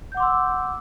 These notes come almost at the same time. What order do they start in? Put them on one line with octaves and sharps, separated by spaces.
G6 F#5 D6 C6 E6